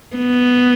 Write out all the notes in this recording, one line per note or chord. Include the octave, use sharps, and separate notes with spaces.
B3